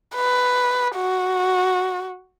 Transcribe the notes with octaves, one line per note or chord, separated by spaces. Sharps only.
B4
F#4